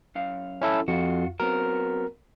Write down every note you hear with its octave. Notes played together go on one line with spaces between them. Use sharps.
F#2 F5
C#4 E4 A4
F2 F4 F#4
F#3 B3 C4 A#4